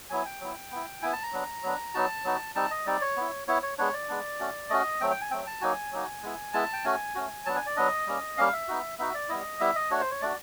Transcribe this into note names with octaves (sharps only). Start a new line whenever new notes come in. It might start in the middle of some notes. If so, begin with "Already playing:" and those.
F#3 B3 E4 G#5
G5
F#3 B3 E4
B3 E4
B3 E4 G#5
A5
A#5
F#3 B3 D4
F#3 B3 D4
F#3 B3 D#4 F#4 A5
F#3 B3 D#4 F#4
G3 C4 D#4 A5
D#5
G3 C4 D#4 D5
C#5
B3 E4
B3 E4 C#5
C#5
G#3 B3 D4 C#5
D5
G#3 B3 D4
A3 C#4 F#4
A3 C#4 F#4 D#5
F#3 A3 C4 G5
G5
G#5
F#3 A3 C4 G5
A5
F#3 A#3 D#4 F#4 G#5
F#3 A#3 D#4 F#4
G#3 B3 E4
G#3 B3 E4 A5
G5
A3 C#4 F#4 G#5
A3 C#4 F#4
F#3 B3 D4 A5
G#5
D5
F#3 B3 D4 D#5
G3 A#3 C#4
G3 A#3 C#4 F5
E5
B3 D#4 F#4
B3 D#4 F#4 E5
D5
G3 B3 E4 D#5
G3 B3 E4 E5
D#5
A3 D4 F#4 C#5
C5
C#5
A3 D4 F#4 D5